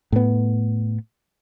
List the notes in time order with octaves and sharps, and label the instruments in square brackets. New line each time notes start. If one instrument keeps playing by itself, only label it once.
[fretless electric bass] A2 B3